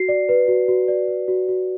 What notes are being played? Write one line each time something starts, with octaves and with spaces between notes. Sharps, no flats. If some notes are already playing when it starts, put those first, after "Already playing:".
Already playing: F#4 C7
D5
B4
F#4
F#4
D5
B4
F#4
F#4